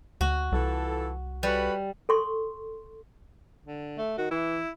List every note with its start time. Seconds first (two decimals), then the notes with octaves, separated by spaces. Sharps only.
0.21 D2 F#4
0.52 C2 E3 F4 A4
1.43 G3 F#4 A4 B4
2.09 A4 C6 C#6
3.66 D3
3.98 A3
4.18 D#3 F#4
4.31 E3 E4